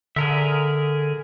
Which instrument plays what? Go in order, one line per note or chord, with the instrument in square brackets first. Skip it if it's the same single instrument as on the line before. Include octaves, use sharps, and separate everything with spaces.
[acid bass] D3 [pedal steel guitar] G#4 A#4 E5